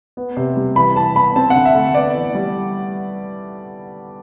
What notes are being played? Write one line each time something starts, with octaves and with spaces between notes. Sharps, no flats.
B3
C3
G3
E3 B5
E3 A5
B3 B5
C4 A5
F#5
D3
E5
A3
B3 D5
E3
G3